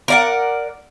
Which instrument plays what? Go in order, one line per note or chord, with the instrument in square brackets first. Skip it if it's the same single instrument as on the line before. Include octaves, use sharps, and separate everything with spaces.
[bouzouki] A#4 D5 F#5